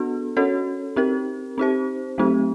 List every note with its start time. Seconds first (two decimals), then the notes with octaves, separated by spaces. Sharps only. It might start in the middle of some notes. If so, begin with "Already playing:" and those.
Already playing: B3 D4 F#4 A4
0.37 C#4 F#4 A4 C#5
0.96 C4 D#4 G4 A#4
1.58 C4 D#4 G4 C5
2.18 F#3 A3 C4 D#4 G4